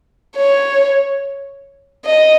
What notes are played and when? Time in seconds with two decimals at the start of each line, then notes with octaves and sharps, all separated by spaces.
0.37 C#5
2.05 D#5